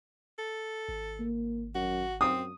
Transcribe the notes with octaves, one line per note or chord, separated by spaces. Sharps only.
A4
G#1
A#3
F#2 F#4
F#2 C4 D#6